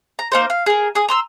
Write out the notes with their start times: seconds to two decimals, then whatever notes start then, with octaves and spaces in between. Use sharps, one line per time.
0.19 A#5
0.32 A#3 D#4 C5
0.50 F5
0.66 G#4 A#4
0.95 G#4 D#6
1.09 A#5 C6 E6